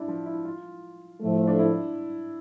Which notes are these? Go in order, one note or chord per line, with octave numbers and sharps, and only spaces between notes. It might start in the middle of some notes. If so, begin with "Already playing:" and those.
Already playing: D4 E4
F3
E4
F4
A2 F3 A3
D4
E4